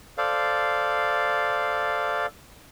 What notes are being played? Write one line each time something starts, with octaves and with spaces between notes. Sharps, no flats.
A4 C5 D5 F5